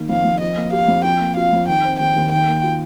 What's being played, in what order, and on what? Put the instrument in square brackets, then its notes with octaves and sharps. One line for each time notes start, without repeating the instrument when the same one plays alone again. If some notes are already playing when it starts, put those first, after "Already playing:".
Already playing: [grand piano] D#3 A#3
[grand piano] F2 [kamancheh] F5
[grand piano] F2
[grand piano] F3 [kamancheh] D#5
[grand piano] A#3
[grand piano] G4 [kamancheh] F5
[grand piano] F2
[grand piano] F3 [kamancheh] G5
[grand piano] A#3
[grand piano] F4 [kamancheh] F5
[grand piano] F2
[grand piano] D#3 [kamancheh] G5
[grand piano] C4
[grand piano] D#2 [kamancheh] G5
[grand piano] D#2
[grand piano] D#3 [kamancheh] G5
[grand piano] A#3
F4